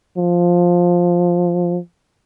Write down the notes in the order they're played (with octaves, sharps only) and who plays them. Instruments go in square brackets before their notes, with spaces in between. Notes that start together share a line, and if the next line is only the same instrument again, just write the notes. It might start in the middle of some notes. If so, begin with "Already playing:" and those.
[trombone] F3